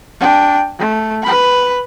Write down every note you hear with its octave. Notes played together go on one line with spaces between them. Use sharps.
D4 G5
A3
B4 B5